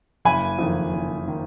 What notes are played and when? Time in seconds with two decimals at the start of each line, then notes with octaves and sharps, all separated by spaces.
0.25 F#1 G#5 B5
0.59 F2 D#3
0.93 F#1
1.28 D#3